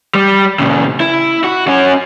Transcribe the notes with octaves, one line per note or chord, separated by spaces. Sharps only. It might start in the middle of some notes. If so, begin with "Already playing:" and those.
G3
A#2 C#3
E4
F#4
C#4 F#4